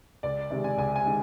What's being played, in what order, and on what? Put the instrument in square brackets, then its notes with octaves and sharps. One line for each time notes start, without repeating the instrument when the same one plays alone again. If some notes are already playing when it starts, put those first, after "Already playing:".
[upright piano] C#2 D5
C3 D#3 G#3
G#5
C#2 G#5
G#5
D#3 G#3